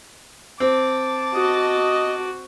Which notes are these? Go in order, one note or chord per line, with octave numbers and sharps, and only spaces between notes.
C4 A5 D6
F#4 D#5